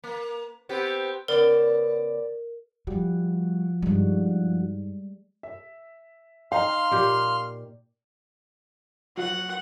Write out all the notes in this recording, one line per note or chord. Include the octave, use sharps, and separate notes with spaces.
A#3
B3 C4 G4
C#3 B3 A#4 D5
F3 G3 F#4
G2 G3 G#3 D#4
E5
D#4 F5 G5 A#5 C6 F6
A#2 G4
F#3 F#5